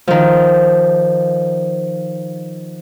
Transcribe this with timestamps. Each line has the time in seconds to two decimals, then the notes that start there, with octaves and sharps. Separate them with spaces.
0.07 D#3 F3